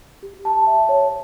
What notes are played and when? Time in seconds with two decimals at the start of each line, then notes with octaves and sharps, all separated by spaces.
0.23 G4
0.45 A5
0.67 E5
0.89 C#5